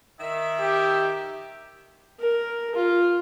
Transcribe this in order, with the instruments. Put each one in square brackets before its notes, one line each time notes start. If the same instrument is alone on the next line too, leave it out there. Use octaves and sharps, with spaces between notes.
[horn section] D#3 E5
[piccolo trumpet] G4
[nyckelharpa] A#4
F4